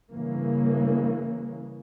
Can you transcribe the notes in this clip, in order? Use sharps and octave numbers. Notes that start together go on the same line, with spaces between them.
G2 C#3 E3 A#3